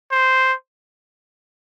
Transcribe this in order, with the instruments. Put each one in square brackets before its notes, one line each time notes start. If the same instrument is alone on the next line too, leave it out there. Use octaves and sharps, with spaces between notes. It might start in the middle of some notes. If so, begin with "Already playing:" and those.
[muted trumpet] C5